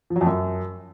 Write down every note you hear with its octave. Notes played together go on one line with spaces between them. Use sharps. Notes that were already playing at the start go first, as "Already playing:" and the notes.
F3
F#3
F2
F#2